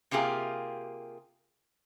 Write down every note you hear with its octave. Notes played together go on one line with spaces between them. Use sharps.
C3 A#3 F4 G4 G#4